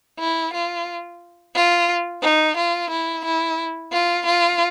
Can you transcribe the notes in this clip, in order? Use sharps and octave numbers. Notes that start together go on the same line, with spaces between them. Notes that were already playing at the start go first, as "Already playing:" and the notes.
E4
F4
F4
D#4
F4
E4
E4
F4
F4